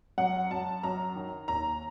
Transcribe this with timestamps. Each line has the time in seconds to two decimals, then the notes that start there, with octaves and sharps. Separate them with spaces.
0.18 F#2 F#5
0.51 F#2 A5
0.83 F#2 A#5
1.15 D#3
1.48 D#2 A#5